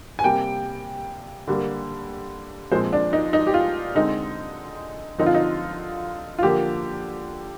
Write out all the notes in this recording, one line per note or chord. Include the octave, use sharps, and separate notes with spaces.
G#5
C3 G3 A#3 G5
D3 G3 A#3
A#2 F3 G#3 C4 C5
D4
D#4
D#4
G4
F4
D3 G#3 C4 D#4
D3 F3 C4 D#4
F4
D#4
F4
D3 F3 A#3 G4